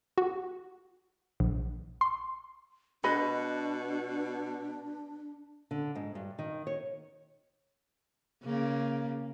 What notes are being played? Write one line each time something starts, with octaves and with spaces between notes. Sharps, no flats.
F#4
A#1
C6
B2 D4 B4 D#5 B5
D3
G#2
G2
D#3
C#5
C#3 A#3